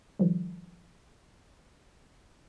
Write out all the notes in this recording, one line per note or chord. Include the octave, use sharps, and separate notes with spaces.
D#3 F3 G3